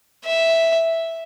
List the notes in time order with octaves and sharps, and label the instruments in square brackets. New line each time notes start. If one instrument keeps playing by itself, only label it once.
[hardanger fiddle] E5